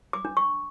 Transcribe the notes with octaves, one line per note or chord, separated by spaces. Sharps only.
D6
D4
C#6